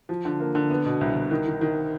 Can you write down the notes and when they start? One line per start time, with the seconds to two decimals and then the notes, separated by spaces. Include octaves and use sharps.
0.09 F3
0.25 D3
0.40 A#3
0.55 D3
0.70 B3
0.85 B2
1.01 C2
1.16 C2
1.31 D#3
1.47 D#3
1.61 D#3